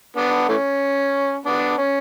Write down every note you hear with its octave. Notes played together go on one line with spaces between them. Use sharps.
B3 D4
E3 A3 C#4
B3 D4
C#4